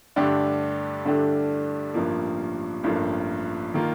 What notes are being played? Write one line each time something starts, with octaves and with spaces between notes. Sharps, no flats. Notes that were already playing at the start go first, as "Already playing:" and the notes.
G2 D3 A3 D4 G4
G2 D3 A3 D4 G4
A1 G2 F3 A#3
A1 G2 F3 A#3
D#3 A#3 F4